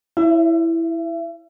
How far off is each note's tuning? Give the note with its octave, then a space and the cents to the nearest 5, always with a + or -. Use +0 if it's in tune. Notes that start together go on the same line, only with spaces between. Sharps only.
E4 +0 C#5 +35 E5 +35